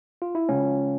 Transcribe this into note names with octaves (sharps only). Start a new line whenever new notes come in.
F4
E4
C#2 C#3 F3 C#4